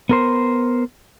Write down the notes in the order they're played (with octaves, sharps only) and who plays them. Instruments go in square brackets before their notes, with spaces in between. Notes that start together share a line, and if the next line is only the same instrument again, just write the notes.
[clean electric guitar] B3 A#4 C5